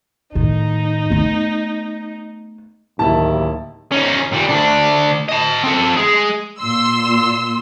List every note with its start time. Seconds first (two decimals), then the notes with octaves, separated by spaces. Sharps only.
0.35 A2 D#3 D#4
1.10 A3 B3
2.99 D1 D#2 E4 A5
3.92 C#4 D#4
4.32 A#2 G3
4.49 D2 D4
5.29 D#5 A5
5.63 C4 A4
5.97 G#3 G#4
6.59 A#2 C6 E6